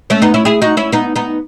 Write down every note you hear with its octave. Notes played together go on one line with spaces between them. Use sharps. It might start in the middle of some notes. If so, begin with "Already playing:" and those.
A3 C#4
B3 D#4
C#4 E4
E4 G#4
D#4 F#4
C#4 E4
B3 D#4
B3 D#4